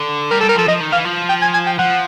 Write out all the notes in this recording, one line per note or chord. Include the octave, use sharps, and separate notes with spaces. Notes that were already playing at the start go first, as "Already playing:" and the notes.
Already playing: D3
G3 A#4
A4
G3
A#4
F3 A4
F3 D#5
D#3
E3 F5
F3
G5
G#5
G#5
G5
F3 F#5